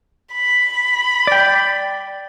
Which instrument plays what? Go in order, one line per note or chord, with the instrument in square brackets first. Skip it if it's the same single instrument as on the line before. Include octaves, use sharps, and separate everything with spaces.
[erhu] B5
[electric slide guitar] D5 G5